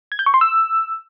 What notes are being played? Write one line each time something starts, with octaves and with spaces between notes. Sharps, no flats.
G#6
G6
C#6
C6
E6